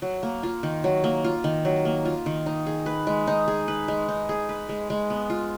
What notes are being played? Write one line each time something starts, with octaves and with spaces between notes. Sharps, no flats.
F#3
A#3
F4
D#3
F#3
A#3
F4
D#3
F#3
A#3
F4
D#3
D#4
G#4
B4
G#3
D#4
G#4
B4
G#3
D#4
G#4
B4
G#3
G#3
B3
F4